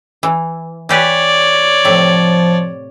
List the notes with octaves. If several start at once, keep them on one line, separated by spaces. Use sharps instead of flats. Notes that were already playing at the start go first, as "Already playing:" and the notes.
E3
E3 G4 B4 C#5 D5
A2 C3 F3